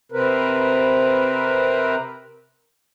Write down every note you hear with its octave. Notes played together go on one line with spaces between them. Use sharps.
C3 C4 A#4 B4